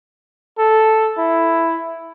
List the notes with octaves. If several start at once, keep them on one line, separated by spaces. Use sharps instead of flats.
A4
E4